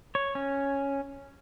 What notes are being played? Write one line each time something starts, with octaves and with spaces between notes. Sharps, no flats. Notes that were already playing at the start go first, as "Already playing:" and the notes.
C#5
C#4